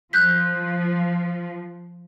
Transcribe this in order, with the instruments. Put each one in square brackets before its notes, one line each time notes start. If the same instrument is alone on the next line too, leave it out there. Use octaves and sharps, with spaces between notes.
[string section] F3 [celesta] F#6 G6 B6